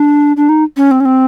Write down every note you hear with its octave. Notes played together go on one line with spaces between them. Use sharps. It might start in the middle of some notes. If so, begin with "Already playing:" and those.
Already playing: D4
D4
D#4
C#4
C4
C#4
C4